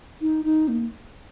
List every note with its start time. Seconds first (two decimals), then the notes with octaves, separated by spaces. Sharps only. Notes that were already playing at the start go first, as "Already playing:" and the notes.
0.21 D#4
0.45 D#4
0.68 A#3